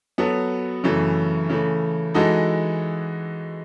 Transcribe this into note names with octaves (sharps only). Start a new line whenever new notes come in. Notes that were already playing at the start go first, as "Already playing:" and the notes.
F#3 B3 F#4 A4
F#2 C#3 E3 A3
C#3 E3 A3
E3 G#3 D#4 F#4 A4